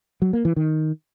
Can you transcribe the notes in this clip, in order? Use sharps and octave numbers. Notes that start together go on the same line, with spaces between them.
F#3
A#3
E3
D#3